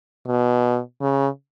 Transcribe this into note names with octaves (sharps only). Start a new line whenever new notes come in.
B2
C#3